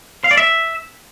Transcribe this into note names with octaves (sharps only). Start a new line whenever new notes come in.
F5
D5
E5